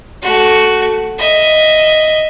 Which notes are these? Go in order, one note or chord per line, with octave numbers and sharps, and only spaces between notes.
A3 F#4
D#5 E5